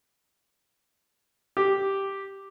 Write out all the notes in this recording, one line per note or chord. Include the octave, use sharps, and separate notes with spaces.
G4